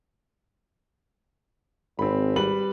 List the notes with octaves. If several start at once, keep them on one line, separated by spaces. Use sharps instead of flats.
G#1 C4 B5
G3 B4 F#7